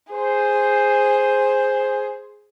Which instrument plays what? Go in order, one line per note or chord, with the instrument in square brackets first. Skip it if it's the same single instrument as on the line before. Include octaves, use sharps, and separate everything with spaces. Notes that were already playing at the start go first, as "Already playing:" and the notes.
[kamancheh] G#4 [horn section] C5